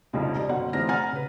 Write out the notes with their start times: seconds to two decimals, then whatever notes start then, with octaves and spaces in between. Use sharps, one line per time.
0.13 C2 F2 G#2 C#3
0.35 C3 D5 D#5
0.49 G1 B2 C#4 F#4 F#5
0.73 F1 E3 C5 F6 A#6
0.89 F#5 G#5 A#5 F6 A6
1.12 C#3 B4